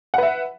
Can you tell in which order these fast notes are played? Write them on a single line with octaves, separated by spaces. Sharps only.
F#5 B4 E5